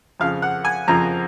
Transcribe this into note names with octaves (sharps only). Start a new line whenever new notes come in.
F2 C#3 F3 F5
F#5
G#5
F2 C#3 F3 A#5